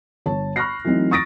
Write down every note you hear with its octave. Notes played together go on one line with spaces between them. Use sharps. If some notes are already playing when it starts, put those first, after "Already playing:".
G1 C#5 A5
B5 C#6 F6 F#6 A#6 C7
E3 F#3 A3 C4 D#4
C#6 D#6 A6 A#6 D7